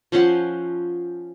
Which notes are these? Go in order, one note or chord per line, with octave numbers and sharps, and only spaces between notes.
F3 C#4 C5 F#5